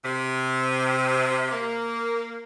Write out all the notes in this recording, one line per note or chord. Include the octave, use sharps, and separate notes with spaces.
C3
A#3